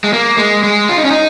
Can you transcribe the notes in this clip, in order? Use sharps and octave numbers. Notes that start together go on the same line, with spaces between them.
G#3
A#3
G#3
G#3
F4
D#4
C#4
D#4